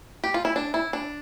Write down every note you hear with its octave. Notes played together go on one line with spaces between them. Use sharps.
G4
F4
E4
D4
E4
D4